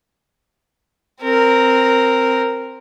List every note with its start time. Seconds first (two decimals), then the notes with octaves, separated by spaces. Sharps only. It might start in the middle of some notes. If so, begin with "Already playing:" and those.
1.22 C4 A#4